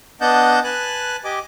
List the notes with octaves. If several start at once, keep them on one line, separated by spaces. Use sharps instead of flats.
B3 D4 D#5 F#5 A5 G6
B4 G#5 A5 F#6
G4 D#5 G#5 D6